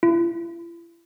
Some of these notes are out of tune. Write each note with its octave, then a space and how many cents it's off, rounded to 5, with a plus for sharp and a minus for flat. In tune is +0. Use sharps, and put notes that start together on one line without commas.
E4 +45